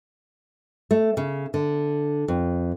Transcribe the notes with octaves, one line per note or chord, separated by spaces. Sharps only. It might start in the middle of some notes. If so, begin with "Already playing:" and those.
A3
C#3
D3
F2